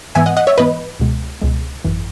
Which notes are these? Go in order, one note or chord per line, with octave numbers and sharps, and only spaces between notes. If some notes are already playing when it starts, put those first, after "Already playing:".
G#2 E3 B3 E5 G#5
D#5 F#5
D#5 F#5
C#5 E5
G#2 E3 B3 B4 D#5
C#2 B2 G#3
C#2 B2 G#3
G#1 F#2 E3